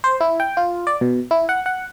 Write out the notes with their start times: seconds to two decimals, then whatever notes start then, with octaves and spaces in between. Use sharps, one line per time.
0.04 C5
0.21 E4
0.40 G5
0.57 F4
0.87 D5
1.01 B2
1.31 E4
1.49 F#5
1.66 F#5